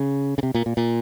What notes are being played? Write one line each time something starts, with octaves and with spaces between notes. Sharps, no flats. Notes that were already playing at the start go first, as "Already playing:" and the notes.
Already playing: C#3
C#3
C3
A#2
A#2
A#2